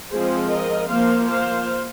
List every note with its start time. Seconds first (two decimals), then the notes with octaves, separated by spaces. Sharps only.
0.11 F3 G#3 C4 G#4 C5
0.51 A#4 D#5
0.90 F3 A#3 C5 F5
1.29 C5 F5